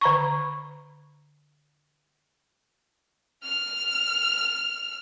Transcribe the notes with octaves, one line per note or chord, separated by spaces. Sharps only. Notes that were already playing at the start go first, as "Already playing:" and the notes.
D3 A#5 C#6
F6 F7